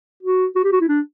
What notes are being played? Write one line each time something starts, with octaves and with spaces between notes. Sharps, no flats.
F#4
F#4
G4
F#4
E4
D4